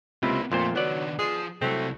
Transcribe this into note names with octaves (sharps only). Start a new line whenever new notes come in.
C#2 C3 A#3 C4 E4 F4
F2 A#2 G#3 A3 F4 C5
D#3 F#3 B3 D4 D5
F3 G#4
C2 F#3 A3 C4 E4